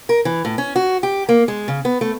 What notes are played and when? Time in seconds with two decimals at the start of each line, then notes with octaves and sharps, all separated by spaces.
0.09 A#4
0.25 E3
0.45 A2
0.58 C#4
0.76 F#4
1.03 G4
1.29 A#3
1.48 G#3
1.68 C#3
1.85 B3
2.01 A3